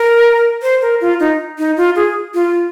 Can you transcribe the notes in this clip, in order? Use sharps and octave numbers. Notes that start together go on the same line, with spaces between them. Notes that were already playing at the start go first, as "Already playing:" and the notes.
Already playing: A#4
C5
A#4
F4
D#4
D#4
F4
G#4
F4